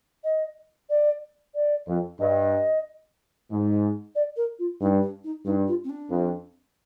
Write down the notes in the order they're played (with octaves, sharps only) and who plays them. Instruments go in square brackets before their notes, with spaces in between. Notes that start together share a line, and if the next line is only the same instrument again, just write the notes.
[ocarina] D#5
D5
D5
[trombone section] F2
[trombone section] G2 [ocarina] D#5
[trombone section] G#2
[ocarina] D5
A#4
F4
[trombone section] G2 [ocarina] D#4
[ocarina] D4
D#4
[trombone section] G2 [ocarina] D#4
[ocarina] F4
C4
D4
[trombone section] F2